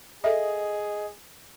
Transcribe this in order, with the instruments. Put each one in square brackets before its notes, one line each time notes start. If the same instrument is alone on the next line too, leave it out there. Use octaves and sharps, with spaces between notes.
[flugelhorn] G#4 [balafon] A4 E5 [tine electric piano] D#5